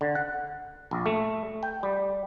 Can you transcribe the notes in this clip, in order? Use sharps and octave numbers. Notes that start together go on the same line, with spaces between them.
D3
F#5
A#1
A3
G5
G3